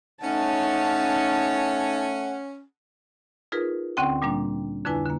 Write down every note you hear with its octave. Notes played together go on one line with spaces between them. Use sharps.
A3 C#4 D#4 F#5 A5
D#4 F4 G#4 A#4 B4
D2 D3 C4 C#4 G5
A#2 G3 A#3 D4
F2 D3 D4 E4 B4 G#5
D3 A#3